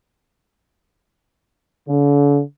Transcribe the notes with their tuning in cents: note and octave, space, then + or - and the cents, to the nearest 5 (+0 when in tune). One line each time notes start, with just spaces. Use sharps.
D3 -45